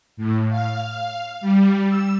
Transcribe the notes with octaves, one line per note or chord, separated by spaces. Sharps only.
A2
F5
G3
E6